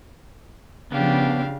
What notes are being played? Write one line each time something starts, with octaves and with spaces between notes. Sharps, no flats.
C#3 F3 B3 D4 G4 F5